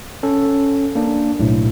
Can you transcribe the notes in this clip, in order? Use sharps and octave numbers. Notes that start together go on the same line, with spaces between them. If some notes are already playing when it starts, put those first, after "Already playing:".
C#4 A4
A#3 D4
B1 A2